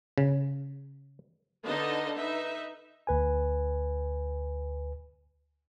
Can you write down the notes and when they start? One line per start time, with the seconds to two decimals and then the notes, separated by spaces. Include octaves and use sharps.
0.18 C#3
1.66 D3 D#4 B4 D#5 F5 A5
2.15 D#4 B4 E5
3.07 D2 B4 G#5